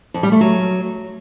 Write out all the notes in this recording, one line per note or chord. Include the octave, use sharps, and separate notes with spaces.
F2
G3
A3
F#3